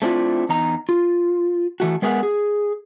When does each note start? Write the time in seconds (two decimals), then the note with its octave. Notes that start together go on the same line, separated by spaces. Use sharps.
0.02 A3 C4 D4 E4 F4
0.49 E2 D#4 A#5
0.89 F4
1.80 E3 A3 F#4
2.02 G#3 B3 G#4 A#4 E5 F#5
2.23 G#4